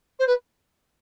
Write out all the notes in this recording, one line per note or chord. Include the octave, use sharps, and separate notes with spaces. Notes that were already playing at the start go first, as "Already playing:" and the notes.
C5
B4